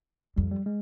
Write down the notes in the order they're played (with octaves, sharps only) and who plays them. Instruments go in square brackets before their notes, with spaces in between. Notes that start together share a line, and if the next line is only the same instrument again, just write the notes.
[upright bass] F2 [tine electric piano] G3
[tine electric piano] G3
G#3